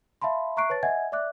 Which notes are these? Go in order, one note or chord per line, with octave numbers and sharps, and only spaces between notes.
E5 F5 A5 B5 C6
E5 A#5 C#6 F#6 C7 D7
B4 C#5 A5 A6
D#5 E5 F#5 G#5 G#6
D5 E5 D6 F#6